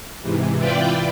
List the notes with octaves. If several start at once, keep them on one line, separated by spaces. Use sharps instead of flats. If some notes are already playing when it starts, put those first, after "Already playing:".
G#2 C3 E3
E4 F4 B4 D5 G5